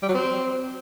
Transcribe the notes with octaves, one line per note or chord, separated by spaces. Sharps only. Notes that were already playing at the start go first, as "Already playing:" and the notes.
G3
F#3
C4